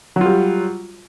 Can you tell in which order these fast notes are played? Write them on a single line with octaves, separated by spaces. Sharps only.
F#3 F4 G3